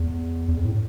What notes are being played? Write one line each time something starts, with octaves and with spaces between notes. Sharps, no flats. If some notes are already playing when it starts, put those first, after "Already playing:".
Already playing: E2
E2
F2
A2